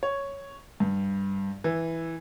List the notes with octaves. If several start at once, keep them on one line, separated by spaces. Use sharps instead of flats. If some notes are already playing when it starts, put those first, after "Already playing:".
C#5
G2
E3